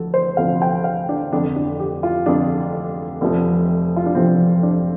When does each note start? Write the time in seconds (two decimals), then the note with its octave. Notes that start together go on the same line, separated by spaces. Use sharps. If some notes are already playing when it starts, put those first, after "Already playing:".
Already playing: D2 F3 A4
0.14 C5
0.37 D2 C3 F3 F5
0.62 G5
0.84 F5
1.09 D4
1.32 F1 F2 D3 D4
1.56 D4
1.80 G4
2.03 F4
2.26 F1 F2 D3 D4
3.21 F1 F2 C3 F3
3.96 F4
4.06 D4
4.15 F1 F2 C3 F3 C4
4.63 D4